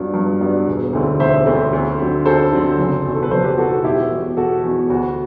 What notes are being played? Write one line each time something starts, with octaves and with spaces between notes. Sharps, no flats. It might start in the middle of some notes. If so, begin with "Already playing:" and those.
Already playing: G2 F#3 B3 D4
G2
F#3 B3 D4
E1
D2 D3 A3 C4
E1 C5 E5
D2 D3 A3 C4
D2
D3 F#3 C4
D2 A4 C5
D3 F#3 C4
F#1
E2 B2
A4
B4
F#1 A4 C5
G4 B4
E2 B2 F#4 A4
F#4
E1 E4 G4
E2 B2
E1 F#4 A4
E2 B2
D2 F#4